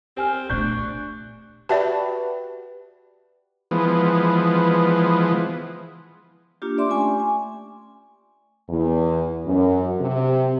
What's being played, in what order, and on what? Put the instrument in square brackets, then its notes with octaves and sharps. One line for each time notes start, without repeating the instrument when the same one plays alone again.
[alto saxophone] C4 [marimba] G4 G#5 F6
[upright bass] A#2 A3 [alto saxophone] D4 [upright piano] C#6 F#6 G6
[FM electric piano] F#4 G4 B4 [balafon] D5 E5 A5
[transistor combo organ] E3 F3 G#3 B3
[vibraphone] A#3 D4 F4 G4
D5 E5 C6 D6
A3 C#4 G#5 C#6
G#5
[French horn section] E2
F#2
C3